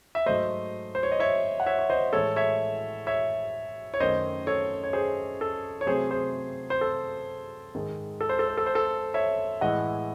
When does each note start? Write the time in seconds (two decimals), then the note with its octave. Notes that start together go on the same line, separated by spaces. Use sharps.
0.15 E5
0.26 G#2 F#3 A3 C5 D#5
0.95 C5
1.03 C#5
1.12 D#5
1.20 C#5 E5
1.60 F#5
1.66 C#5 E5
1.79 C#5
1.90 C5 D#5
2.13 A2 E3 G#3 A4 C#5
2.36 C#5 E5
3.07 C#5 E5
3.94 C#5
4.00 F#2 D#3 A3 C5 D#5
4.47 A4 C#5
4.84 C#5
4.93 G#4 C5
5.41 A4
5.81 C#5
5.87 C3 F#3 A3 G#4 C5
6.11 G#4 C5
6.70 C5
6.81 A4
7.75 G#2 D#3 G#3
8.21 A4
8.29 C5
8.39 A4
8.48 C5
8.57 A4
8.66 C5
8.75 A4
9.14 C#5 E5
9.61 A2 E3 G#3 D#5 F#5